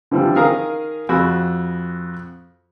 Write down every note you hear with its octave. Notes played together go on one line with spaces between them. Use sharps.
D3 E3 F3 G3
D#3 G#4 A#4 F5 A#5 D#6
F2 F#4 G#4 B5 E6